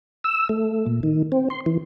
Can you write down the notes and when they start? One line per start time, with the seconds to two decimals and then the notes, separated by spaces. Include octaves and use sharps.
0.24 E6
0.49 A3
0.86 A#2
1.03 D#3
1.32 C4
1.50 C6
1.66 E3